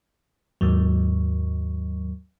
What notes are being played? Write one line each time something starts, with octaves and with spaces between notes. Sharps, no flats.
D#2 G#2 F#3